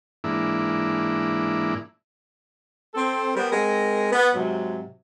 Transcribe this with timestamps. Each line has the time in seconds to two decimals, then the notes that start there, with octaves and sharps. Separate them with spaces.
0.24 G#2 E3 A#3 D4 E4
2.94 C4 A4
3.35 G3 B3 A#4 C5
3.51 G#3 C4 A#4
4.12 B3 B4
4.35 G#2 C3 F#3